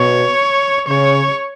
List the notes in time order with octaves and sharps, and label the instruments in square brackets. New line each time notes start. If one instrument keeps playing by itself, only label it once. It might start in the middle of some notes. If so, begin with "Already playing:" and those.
Already playing: [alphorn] B2 [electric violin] C#5
[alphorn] C#3 [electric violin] C#5